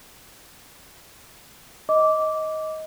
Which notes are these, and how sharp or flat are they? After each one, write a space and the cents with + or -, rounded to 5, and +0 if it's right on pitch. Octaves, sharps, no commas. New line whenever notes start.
D#5 +15 D6 -10